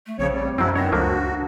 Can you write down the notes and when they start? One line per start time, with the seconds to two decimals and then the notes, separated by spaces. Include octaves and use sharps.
0.07 A3
0.19 A#1 C#3 F3 C4 C#5
0.32 G3
0.58 F#2 F3 F#3 G#3 C4 C#4 E4
0.76 D#3 B3 D4 C#5 A#5
0.92 C#2 F3 A3 A#3 F#4